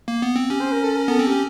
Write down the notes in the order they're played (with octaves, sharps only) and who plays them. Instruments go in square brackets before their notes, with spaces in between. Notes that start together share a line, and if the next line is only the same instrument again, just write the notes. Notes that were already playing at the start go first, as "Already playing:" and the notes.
[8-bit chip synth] A#3
B3
C4
[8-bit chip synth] C#4 [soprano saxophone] G4
[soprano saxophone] C5
A#4
A4
A#4
[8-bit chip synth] B3 [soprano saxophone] A4
[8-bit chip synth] C4
[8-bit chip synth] C#4 [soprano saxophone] G4